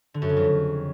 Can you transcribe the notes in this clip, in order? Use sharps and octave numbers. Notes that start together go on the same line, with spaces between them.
D3
F#2
C#3
F2
C#3